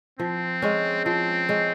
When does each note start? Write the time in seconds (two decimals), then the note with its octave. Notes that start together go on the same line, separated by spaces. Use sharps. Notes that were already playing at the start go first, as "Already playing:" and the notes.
0.19 F3 C4
0.62 G#3 C#4
1.05 F3 C4
1.49 G#3 C#4